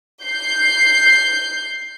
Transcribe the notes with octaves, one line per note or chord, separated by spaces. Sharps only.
G6 C7